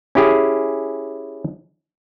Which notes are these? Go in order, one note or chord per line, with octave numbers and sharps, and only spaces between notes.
C#4 E4 G4 G#4